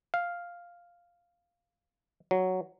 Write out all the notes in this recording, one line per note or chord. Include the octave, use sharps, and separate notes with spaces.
F5
F#3